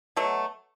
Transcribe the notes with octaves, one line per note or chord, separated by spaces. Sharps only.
B2 F#3 A3